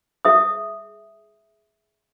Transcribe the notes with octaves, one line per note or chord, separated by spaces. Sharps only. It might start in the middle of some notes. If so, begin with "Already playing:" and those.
G#4 E5 D#6